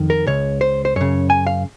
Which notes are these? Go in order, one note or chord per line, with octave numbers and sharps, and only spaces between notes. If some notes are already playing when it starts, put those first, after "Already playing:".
Already playing: F2 D#3
A#4
C#2 C#3 C#5
C5
C5
F#2 C#3 C#5
G#5
F5